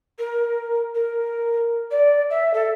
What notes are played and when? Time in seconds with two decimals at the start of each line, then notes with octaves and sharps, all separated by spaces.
0.18 A#4
0.95 A#4
1.91 D5
2.30 E5
2.53 A4